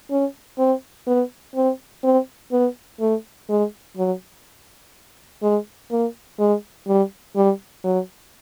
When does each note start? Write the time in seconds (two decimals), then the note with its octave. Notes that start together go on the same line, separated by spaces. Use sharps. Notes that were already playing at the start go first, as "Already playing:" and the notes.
0.11 C#4
0.58 C4
1.07 B3
1.55 C4
2.04 C4
2.52 B3
3.00 A3
3.49 G#3
3.97 F#3
5.43 G#3
5.91 A#3
6.39 G#3
6.88 G3
7.36 G3
7.84 F#3